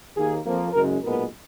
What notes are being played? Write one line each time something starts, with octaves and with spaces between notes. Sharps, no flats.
D#2 D#3 A#3 G#4
F2 F3 A#3
F#1 F#2 C#3 G#3 A#4
B1 A#2 G#3 B3 A#4